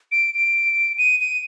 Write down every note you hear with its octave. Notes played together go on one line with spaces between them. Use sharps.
D7
D7
D#7
D#7